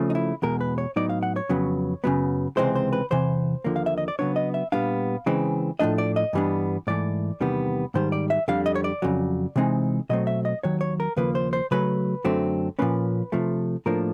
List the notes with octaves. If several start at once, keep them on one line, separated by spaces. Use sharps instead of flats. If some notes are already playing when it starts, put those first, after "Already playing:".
Already playing: C#3 F3 A3
D#4
E4
E2 B2 G#3 A#4
B4
C#5
A2 F#3 B3 D#4 D5
F5
F#5
C#5
F2 C#3 F#3 B3
F#2 C#3 F#3 B3
C#2 C3 E3 G#3 C4 C5
C5
B4
E2 C3 E3 C5
D#2 D3 F3 A#3
F5
E5
D#5
D5
C#3 F#3 B3 D4 C#5
D#5
E5
A#2 G3 B3 D4 F5
C#3 E3 G#3 C4
A2 F3 A3 D4 D#5
D5
D#5
G2 E3 G3 B3 D4
G#2 E3 A3 D5
E2 C3 D#3 G3 B3
G#2 D#3 G3 C5
D5
E5
F2 D3 G3 F5
D#5
C#5
D5
F2 C#3 F#3
C3 E3 G#3 C4 D#4
B2 F#3 A3 C4 D#5
E5
D#5
D#2 D#3 F#3 C#5
C#5
A#4
D#2 C#3 F3 A#3 B4
C5
C5
C#3 F#3 A3 B4
F#2 D3 F#3 A3 C4
A#2 F3 A#3 C#4 B4
C3 F3 A3
A2 F3 A#3 D4 A#4